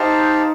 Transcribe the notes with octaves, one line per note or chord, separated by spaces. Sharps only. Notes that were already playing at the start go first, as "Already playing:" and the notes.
Already playing: D#4 G4 C5 F5 A5